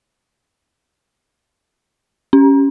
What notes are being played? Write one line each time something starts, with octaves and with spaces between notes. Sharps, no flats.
C#4